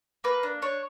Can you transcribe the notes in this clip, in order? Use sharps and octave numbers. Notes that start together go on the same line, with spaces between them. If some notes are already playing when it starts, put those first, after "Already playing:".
A#3 B4
D4
D4 C#5